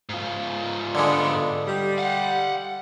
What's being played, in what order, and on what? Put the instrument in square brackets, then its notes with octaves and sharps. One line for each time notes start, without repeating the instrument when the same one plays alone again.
[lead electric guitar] G#2 F4
[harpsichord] D3 G#3 [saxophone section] A3 B3 D4
[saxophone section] G3
[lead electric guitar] F5 F#5